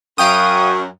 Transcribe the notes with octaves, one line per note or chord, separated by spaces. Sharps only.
F#2 F5 G5 C#6 D#6